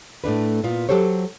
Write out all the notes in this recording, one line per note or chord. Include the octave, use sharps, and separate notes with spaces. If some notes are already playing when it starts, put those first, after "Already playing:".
A2 A3 D4 B4
A#2 B3 F4
F#3 G4 A4 C5 C#5